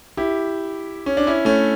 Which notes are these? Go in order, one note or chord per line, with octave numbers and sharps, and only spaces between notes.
E4 G4
C#4
D4
C#4 E4
A3 C#4